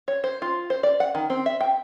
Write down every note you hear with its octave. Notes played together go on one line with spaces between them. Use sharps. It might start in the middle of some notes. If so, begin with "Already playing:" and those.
C#5
C5
F4
C5
D5
F#5
D#3
C4
E5
G5